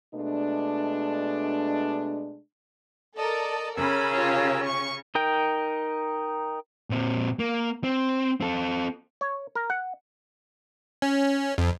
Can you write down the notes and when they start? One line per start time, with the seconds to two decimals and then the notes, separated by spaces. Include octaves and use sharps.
0.14 B2 G#3 A3 D4
3.17 A4 A#4 D5 D#5 A5
3.77 C#3 C#4 A#4 B5 E6
4.14 F4 G4 C#5
4.63 C#6
5.15 D#4 A#4 G5
6.90 A#2 C4
7.39 A#3
7.84 C4
8.41 C4 A4
9.21 C#5
9.55 A#4
9.70 F#5
11.02 C#4
11.58 F2